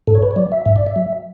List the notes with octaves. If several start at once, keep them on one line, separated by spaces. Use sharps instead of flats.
G#2 A4
C#5
B4
C#5
F#3 D5
E5
G#2 E5
D5
E5
F#3